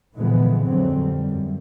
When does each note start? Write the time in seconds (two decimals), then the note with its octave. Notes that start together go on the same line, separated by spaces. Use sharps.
0.16 A#2 D3 E3 F3 G#3 B3
0.66 F2 D3 F#3 C4
1.00 G3
1.29 F#2